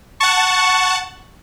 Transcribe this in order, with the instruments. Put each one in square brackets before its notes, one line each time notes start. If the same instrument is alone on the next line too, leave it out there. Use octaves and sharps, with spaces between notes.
[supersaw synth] F#5 A5 [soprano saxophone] C#6